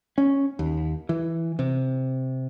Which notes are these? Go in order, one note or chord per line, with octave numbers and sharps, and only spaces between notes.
C#4
D#2
E3
C3